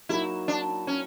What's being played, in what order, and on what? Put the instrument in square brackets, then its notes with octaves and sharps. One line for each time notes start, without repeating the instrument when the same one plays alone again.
[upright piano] F#3 A#3 D#4 F#4 [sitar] E4
[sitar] D4
C#4